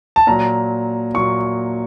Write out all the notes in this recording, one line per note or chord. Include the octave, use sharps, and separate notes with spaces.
A5
A#2 F#3 A#5
A#2 F#3 C#6